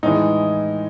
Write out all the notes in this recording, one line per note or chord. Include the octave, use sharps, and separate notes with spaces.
A2 E3 G#3 D#4